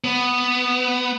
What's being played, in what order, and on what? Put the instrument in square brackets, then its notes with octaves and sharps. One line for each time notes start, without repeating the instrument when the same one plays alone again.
[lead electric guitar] B3